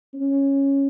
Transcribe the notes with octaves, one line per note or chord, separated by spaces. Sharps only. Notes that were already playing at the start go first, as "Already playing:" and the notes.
C#4